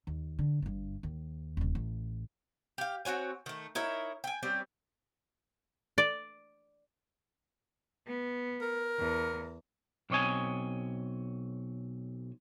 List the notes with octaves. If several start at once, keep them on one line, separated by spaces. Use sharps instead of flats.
D#2
D3
G1 G2
D#2
D#1 C2
A1
G4 F5
C4 F#4 C#5 G#5
D#3 A3
D#4 E4 A#4 C#5
G5 G#5
G3 C4 C#4 G4
D5
B3
A#4
E2
B1 C4 C#5 D#5 G#5